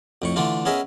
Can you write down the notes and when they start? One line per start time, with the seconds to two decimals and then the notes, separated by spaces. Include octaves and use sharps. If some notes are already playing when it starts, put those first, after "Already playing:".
0.22 F2 A2 C#6
0.36 D3 E3 A3 D4 F4
0.65 B3 C#4 G#4 A#4 D#5 E5